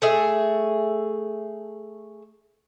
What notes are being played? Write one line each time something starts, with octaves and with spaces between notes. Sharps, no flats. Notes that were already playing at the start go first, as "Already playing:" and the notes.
A3 G#4 E5